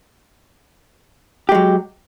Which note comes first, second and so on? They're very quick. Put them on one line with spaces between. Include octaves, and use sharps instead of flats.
G4 G#3 F#3